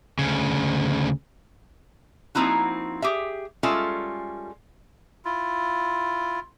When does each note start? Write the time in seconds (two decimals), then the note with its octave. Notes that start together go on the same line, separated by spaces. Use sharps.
0.19 D2 C#3
2.35 F3 A#3 C4 D#4 E4 F#4
3.02 G4 G#4 E5
3.63 G3 G#3 C#4 F4 A4 E5
5.25 E4 F4